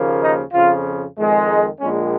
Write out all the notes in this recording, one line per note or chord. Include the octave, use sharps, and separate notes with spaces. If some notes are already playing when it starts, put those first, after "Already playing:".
Already playing: D#2 C#3 F3 A#3
D#4
F2 C#3 F3 F4
F2 D#3 G#3
D#4
A#1 A#2 G#3 C#4